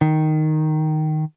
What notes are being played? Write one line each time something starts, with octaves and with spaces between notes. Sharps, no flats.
D#3